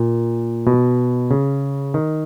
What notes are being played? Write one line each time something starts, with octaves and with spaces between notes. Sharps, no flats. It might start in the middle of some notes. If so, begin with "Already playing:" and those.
Already playing: A#2
B2
C#3
D#3